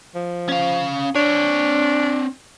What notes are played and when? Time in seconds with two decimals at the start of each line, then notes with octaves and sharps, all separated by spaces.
0.15 F3
0.49 C#4 F5
1.15 C4 D4 C#5